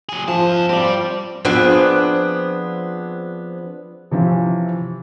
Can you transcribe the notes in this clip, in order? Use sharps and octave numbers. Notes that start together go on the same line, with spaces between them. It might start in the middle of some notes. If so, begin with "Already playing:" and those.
F#3 G#4
F2 F3 A5
C4 G4 D5 F5
F3 B3 C4 D4 G#4
C3 E3 F3 C#4